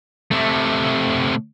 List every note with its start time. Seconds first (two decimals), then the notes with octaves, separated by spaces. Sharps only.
0.31 C3 A3